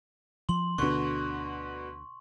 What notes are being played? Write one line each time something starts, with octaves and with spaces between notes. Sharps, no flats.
F3 C6 F#7
D2 B2 D3 D4 C#6